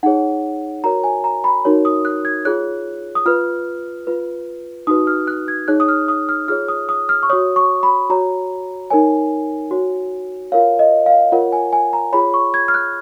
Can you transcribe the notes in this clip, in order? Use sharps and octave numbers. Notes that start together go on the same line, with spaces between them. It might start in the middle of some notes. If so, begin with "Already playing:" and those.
D#4 G#4 C#5 F#5
F#4 A#4 C#5 A#5
G#5
A#5
B5
D#4 F#4 A#4 C#5
D#6
F#6
G#6
F4 G#4 C#5 F#6
D#6
F4 B4 F6
F4 B4
D#4 F#4 B4 D#6
F6
F#6
G#6
D#4 G#4 C#5 F#6
D#6
F6
D#6
F6
F4 G#4 C#5 F6
D#6
D#6
F6
C#6
F#4 C#5 D#6
C#6
B5
F#4 C#5 A#5
D#4 A#4 C#5 G#5
F#4 C#5
F4 A#4 C#5 F5
D#5
F5
F4 A#4 C#5 F#5
G#5
G#5
A#5
F4 G#4 C#5 B5
C#6
G#6
F6
F#6